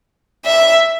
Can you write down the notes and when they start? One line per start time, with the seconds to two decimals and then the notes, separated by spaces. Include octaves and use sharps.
0.45 E5